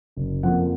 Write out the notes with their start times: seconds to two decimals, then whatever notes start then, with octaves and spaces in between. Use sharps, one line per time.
0.16 F#1
0.43 F2 F3 A#3 F#5